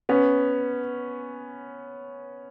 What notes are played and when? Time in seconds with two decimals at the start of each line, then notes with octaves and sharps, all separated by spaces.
0.09 B3 C#4